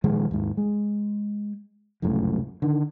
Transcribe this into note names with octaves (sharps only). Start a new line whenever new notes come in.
A#2 D#3 F3 G#3
D#2 G#2
G#3
F1 C#2 F#2 A2
D3 D#3